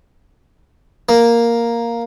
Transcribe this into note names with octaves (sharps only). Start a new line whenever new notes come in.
A#3